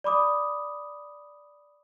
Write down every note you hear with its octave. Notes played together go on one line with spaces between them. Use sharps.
D5 B5 D6 D#6